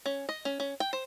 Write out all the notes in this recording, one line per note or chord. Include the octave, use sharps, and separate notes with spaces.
C#4
D#5
C#4
C#4
G5
C5